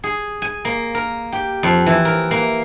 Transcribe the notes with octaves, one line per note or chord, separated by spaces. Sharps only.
G#4
G#5
A#3
A#4
G4
F2
E3
A#4
A#3